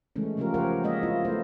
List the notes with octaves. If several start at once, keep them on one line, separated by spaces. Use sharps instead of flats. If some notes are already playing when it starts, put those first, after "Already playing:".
C#3 E3 G#3 A3 C#4
C#3 F3 C#4 F4 G4 A#4
G4 A#4 C5 C#5 F5 F#5
G#3 A#3 C#5 D#5 E5
C4 E4 F4
A3 B3 C5